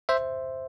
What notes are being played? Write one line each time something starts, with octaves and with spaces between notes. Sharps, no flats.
C5 E5